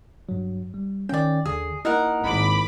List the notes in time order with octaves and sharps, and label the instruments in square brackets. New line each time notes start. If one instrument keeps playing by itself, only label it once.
[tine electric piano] G2 F#3
G3
[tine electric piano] D#3 C#4 [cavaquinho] D5 G5
[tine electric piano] D#2 D3 [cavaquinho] G#4
[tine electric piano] A#3 E4 [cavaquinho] D#4 A#4 F#5
[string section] G#1 B5 D6